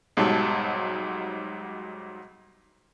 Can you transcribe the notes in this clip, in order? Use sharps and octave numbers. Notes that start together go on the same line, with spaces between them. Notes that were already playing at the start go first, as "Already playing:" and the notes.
B1 G#2 F#3 G3 A5